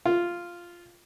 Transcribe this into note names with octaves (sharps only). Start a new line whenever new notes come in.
F4